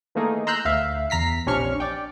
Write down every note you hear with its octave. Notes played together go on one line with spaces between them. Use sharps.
D#3 E3 A3 A#3 D#4 G#4
A#5 C6 E6 F#6 G6
D2 E5 F5
E2 A#5 B6 C7
A#1 C3 C#4 D4 C#6 F6
D5 G5